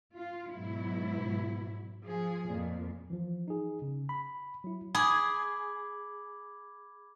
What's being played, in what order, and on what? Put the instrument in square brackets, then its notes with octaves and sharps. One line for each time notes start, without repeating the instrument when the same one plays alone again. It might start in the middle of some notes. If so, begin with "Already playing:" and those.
[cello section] F4
G#2 B2 F#3 E4
F3 G#4
F2 A#2
[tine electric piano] E3 F3
D#4 G#4
C#3
B5
F#3 E4
[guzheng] G#4 [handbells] B5 D6 G#6